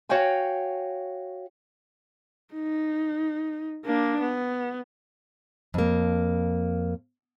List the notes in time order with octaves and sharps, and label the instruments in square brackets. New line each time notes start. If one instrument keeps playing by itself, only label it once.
[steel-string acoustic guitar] F#4 C#5 F5 G5 G#5
[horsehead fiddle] D#4
A#3 D4
B3
[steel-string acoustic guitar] F2 A#3